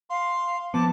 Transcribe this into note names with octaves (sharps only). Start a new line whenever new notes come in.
F5 C6
F3 B3 A5 D6